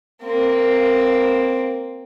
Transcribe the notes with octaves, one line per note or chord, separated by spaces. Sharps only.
A#3 C4